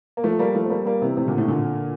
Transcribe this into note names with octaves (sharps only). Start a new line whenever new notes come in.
A#3
F3 A3
G3 A#3
F3 A3
C4
G3 A#3
G3 A#3
C3 E3
A2 C3
A#2 D3
A2 C3
A#2 D3